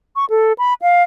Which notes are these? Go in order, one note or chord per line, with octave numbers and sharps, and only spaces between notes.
C#6
A4
B5
F5